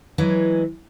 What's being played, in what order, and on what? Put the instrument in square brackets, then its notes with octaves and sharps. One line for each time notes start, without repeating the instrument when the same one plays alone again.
[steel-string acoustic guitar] E3 F#3 G#3